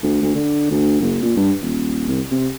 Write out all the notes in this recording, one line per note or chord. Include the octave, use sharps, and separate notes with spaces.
D2
D2
D3
D2
F#1
A#2
G2
D#1
C2
C3